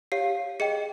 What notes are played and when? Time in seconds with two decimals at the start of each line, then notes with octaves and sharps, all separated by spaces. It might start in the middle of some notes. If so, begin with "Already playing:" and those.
0.12 G4 C#5 F5 C7
0.60 G#4 D#5 G5 C#7